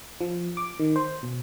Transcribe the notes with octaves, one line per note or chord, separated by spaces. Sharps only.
F3
D6
D#3
C5
B2